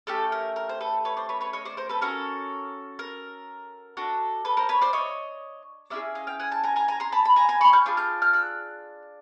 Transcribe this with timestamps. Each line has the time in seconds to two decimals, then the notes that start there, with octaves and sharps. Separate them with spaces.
0.07 A3 C#4 G4 A4
0.32 A#4
0.56 A#4
0.69 C5
0.80 A4 B4
1.05 B4 C#5
1.17 C5 D5
1.29 B4 C#5
1.41 B4 C#5
1.53 C#5 D#5
1.65 C5 D5
1.77 A#4 C5
1.89 A4 B4
2.02 C#4 F#4 A4 A#4
2.99 A#4
3.97 D4 F#4 A4
4.45 A4 B4
4.57 A#4 C5
4.69 B4 C#5
4.82 C5 D5
4.93 C#5 D#5
5.90 A#3 C#4 E4 G#4 D5 E5
6.15 D#5 F5
6.27 F5 G5
6.40 F#5 G#5
6.52 G5 A5
6.63 G#5 A#5
6.76 G#5 A#5
6.88 G#5 A#5
7.00 A#5 C6
7.12 A5 B5
7.25 B5
7.36 G#5 A#5
7.49 G#5 A#5
7.61 B5 C#6
7.73 F6 G6
7.86 D4 F4 G#4
7.97 F6 G6
8.22 F6 G6
8.33 E6 F#6